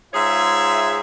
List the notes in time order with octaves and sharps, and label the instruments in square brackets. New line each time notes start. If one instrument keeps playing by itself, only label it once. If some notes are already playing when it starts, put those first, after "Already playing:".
[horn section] G#2 F4 G#4 C#5 E5